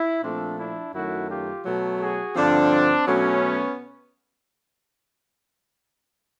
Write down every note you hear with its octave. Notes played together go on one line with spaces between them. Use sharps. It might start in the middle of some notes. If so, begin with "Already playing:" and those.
Already playing: E4
A#2 F3 A3 C4 D4
D4 E4
F#2 D#3 F#3 A3 E4 F#4
F4 G4
B2 F#3 A3
F#4 G#4
G2 D3 F3 C4 D4
B2 F#3 A3 B3 C#4